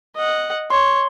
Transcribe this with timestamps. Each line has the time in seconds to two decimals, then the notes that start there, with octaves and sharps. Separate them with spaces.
0.16 D#5 F#5
0.70 C#5 C6